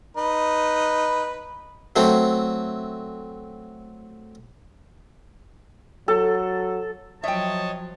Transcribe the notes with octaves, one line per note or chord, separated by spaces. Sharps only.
D#4 B4
F#3 A3 C4
F#3 A4
F3 F#3 C#5 D#5 E5 G5 A5